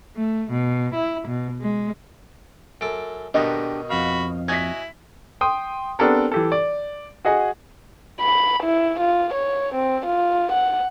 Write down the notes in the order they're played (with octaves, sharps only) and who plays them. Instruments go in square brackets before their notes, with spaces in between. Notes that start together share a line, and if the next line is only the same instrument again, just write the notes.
[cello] A3
B2
E4
B2
G#3
[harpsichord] F#2 A4 [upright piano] D7
[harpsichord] B2 D#3 B3 [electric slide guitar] D4 G4 A4 [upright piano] D#5
[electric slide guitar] F2 F5 [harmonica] F#4 B5
[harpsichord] C#4 F#4 D#5 [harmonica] E4 [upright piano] G#6 B6
[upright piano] G5 C6 D#6
B3 C4 D4 G4 A4 A#4
E3 G4 A4
D5
F#4 G#4 D#5 F#5 G#5
[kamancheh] B5
E4
F4
C#5
C4
F4
F#5